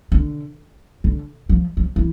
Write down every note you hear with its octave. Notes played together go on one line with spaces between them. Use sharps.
D3
D3
F3
F3
E3